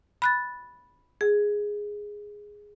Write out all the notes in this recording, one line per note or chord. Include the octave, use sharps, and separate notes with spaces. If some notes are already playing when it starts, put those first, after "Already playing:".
B5 F#6 A6
G#4